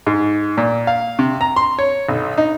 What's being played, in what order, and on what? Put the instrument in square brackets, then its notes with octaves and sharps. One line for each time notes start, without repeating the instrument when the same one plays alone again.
[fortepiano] G#2
A#2
F5
C3
A#5
C6
C#5
B1
D#4